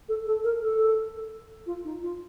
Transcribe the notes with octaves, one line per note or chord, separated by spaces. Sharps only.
A4
A4
A#4
A4
F4
D#4
F4